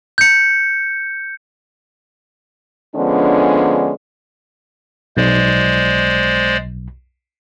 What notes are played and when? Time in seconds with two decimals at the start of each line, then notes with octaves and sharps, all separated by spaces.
0.18 G6 C#7
2.96 D3 F3 G#3 B3 C#4 D4
5.17 B1 G#3 C5 D5